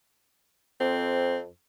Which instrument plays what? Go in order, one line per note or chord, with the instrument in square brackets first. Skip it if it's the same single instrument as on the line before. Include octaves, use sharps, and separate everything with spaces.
[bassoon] F2 [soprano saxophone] C4